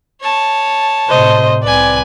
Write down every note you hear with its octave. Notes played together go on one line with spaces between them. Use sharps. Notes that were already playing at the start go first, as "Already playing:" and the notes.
C#5 A5
A2 C3 C5 D#5
C2 C4 B4 D5 G#5